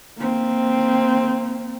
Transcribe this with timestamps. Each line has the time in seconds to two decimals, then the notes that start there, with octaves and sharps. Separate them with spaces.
0.18 A#3 C4